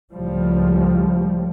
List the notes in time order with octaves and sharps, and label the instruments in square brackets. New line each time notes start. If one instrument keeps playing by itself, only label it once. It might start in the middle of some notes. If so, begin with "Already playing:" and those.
[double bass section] C#2 A2 F3 G3